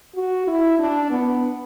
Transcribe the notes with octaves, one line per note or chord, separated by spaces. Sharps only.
F#4
E4
D4
B3